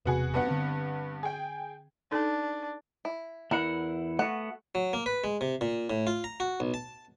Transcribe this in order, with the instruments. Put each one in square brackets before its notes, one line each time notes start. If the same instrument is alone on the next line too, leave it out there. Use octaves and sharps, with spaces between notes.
[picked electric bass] E1 C3 [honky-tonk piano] B3 F#4 G#4
[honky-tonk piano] G2 B3 F#5
[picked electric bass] D3 C4
[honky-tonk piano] G#4 G5
[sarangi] D4 [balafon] D#4 A4
[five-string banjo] E4
[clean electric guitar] E2 E4 F#5 [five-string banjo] A#4
[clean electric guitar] A3 B3 F#4 [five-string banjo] F#5
[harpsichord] F#3
A#3
B4
G#3
C3
A#2
A2
F4
A#5
F#4
B1
A5